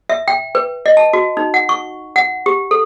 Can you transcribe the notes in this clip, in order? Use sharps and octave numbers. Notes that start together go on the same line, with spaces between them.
E5
G5
B4
D#5
A5
F#4
D#4
F#5
C#6
F#5
G4
A4